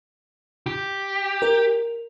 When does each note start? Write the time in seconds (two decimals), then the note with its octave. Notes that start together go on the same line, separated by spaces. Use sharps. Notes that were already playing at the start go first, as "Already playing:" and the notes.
0.66 G4
1.42 A#4